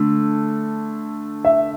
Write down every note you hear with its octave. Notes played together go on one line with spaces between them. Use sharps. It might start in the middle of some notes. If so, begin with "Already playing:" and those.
Already playing: D3 A3
E5